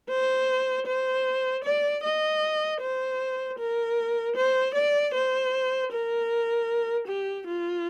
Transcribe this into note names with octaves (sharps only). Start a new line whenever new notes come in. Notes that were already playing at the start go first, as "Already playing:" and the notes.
C5
C5
D5
D#5
C5
A#4
C5
D5
C5
A#4
G4
F4